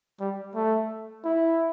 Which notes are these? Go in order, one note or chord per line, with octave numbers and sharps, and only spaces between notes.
G3
A3
E4